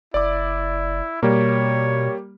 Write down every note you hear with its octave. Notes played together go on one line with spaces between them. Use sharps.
F#1 E4 D5 D6
B2 G3 A#3 C#5